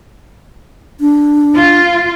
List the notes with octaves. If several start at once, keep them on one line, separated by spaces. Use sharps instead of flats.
D4
F4